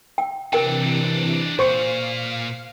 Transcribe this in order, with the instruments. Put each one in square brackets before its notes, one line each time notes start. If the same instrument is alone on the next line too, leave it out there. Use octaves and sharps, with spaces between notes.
[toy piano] G5
[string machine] C3 E3 [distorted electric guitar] D4 D#4 [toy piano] A#4 G5
[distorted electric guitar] A#2 [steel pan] C5 C#6 [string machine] F5